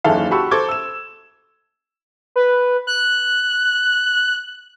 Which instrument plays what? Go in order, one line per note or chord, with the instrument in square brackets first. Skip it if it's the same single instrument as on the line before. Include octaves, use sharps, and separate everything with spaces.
[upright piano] F#1 D#2 E3 A4 F5
F#4 G4 A5 B5 C#6 E6
A4 C5 A5 D6 G#6
E6 E7
[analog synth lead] B4
F#6